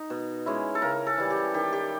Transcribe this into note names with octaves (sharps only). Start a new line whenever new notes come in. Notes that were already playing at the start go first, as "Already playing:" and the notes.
Already playing: D#4
B2
G#3 C#4 E4
A4
C#3 A#4
A4
E3 G3
G4
D#3 G4
G4